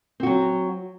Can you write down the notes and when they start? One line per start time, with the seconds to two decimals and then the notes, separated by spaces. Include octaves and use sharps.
0.20 C4
0.23 F#4
0.26 F#3